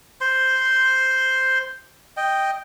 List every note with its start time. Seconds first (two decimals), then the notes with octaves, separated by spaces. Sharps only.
0.21 C5 C6
2.17 D#5 G5